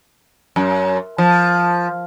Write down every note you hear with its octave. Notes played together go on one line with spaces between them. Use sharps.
F#2
F3